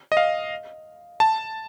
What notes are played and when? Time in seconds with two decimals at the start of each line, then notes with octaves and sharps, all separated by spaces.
0.12 D#5
0.17 F5
1.20 A5